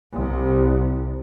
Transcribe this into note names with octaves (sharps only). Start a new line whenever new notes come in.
C2 C3